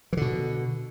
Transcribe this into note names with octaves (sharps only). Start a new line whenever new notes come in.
B2 D3 E3